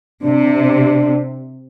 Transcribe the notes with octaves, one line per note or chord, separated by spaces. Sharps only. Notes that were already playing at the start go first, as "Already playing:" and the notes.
C3 D4